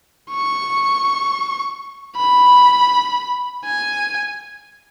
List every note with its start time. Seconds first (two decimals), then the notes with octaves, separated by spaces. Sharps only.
0.31 C#6
2.17 B5
3.65 G#5